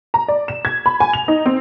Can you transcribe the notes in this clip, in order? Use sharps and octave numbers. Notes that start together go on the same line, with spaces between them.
A#5
D5
E7
G#6
B5
G#5
F7
D#4
C4